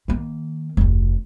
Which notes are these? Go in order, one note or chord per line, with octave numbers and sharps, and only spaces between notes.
D#3 A#3
F1 D2